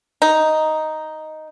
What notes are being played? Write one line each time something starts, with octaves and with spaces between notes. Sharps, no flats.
D#4